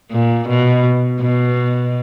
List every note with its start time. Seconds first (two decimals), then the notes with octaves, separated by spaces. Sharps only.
0.11 A#2
0.48 B2
1.21 B2